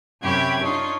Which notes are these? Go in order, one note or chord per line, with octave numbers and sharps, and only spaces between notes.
F#2 C3 G4 C#5 B5 G#6
D4 D#4 F4 C#5